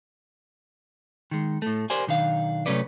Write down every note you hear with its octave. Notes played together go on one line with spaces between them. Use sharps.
D#3 G#3
A2 A3
G4 A#4 C5 D5 G#5
B1 D#3 D4 F5
C3 F#3 A3 C#4 B4 D5